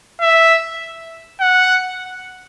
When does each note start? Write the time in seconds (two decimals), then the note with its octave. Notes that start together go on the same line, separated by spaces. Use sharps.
0.21 E5
1.40 F#5